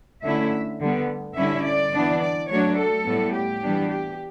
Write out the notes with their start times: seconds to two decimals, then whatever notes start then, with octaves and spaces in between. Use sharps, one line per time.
0.24 D3 A3 C#4 E4 E5
0.81 D3 G3 B3
1.37 D3 G3 C#4 E4 E5
1.66 D5
1.94 E3 B3 D4
2.22 D5
2.50 F#3 A3 D4 C#5
2.78 A4
3.06 A2 G3 B3
3.34 G4
3.63 E3 G3 B3 D4
3.92 G4